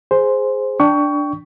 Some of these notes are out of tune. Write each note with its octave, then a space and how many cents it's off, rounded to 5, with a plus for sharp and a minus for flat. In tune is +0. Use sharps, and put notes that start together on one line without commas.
G#4 +0 C5 +0
D4 +0 G5 +0 C#6 +25